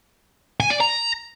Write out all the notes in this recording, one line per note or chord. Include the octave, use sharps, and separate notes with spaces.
G#5
D5
A#5